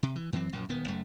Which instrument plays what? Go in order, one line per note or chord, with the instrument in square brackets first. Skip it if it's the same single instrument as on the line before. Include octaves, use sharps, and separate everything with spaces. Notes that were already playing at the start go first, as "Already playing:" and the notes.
[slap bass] C3
E3
F#2 E3 F#3 C4
A#1 F#2 A#2
D#1 D#3 B3
F#1 F#2 A3